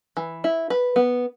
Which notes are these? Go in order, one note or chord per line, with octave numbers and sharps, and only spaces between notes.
E3
E4
B4
B3